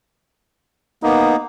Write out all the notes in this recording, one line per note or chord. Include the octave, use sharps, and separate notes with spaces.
A#3 B3 D#4